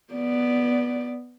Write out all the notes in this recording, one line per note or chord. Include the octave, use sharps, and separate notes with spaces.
B3 D5